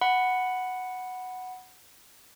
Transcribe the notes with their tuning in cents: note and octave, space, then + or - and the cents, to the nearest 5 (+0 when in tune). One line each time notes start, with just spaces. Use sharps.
F#5 +0 B5 +0